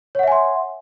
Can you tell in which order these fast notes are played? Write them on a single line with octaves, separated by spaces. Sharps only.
C#5 F#5 E5 G#5 C6